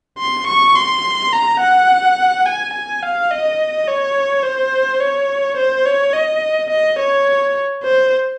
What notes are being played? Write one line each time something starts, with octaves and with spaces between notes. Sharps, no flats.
C6
C#6
C6
A#5
F#5
G#5
G#5
F5
D#5
C#5
C5
C#5
C5
C#5
D#5
D#5
C#5
C5